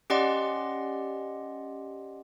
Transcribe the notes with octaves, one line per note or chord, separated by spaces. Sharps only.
C#4 G4 D5 D#5 F#5 C6